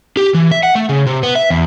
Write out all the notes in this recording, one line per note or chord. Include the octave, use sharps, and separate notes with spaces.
G4
E3
E5
F#5
A3
C#3
C3
B3
E5
E2